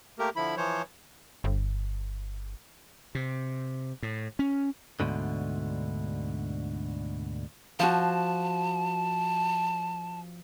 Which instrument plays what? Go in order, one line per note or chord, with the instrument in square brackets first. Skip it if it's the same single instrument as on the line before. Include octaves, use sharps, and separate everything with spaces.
[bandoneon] A3 A#3 G4 A#4
D3 F3 E4 B5
E3 F3 C5 C#5
[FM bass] G1
[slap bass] C3
A2
C#4
[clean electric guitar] D2 G#2 B2 D3
[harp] F3 F#4 [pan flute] A5